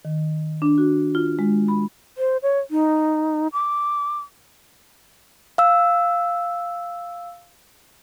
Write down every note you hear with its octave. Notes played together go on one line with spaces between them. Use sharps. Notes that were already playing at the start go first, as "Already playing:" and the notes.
D#3
D4
F#4
F4
G#3
B5
C5
C#5
D#4
D6
F5 E6